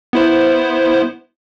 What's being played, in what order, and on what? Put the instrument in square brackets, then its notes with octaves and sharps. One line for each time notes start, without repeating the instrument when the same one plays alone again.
[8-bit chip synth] B3 E4 C5